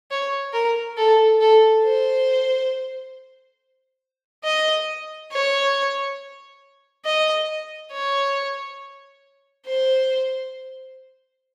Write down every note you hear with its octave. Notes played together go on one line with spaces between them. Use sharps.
C#5
A#4
A4
A4
C5
D#5
C#5
D#5
C#5
C5